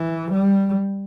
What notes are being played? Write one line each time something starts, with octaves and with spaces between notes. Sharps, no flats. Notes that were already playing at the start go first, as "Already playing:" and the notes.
Already playing: E3
G3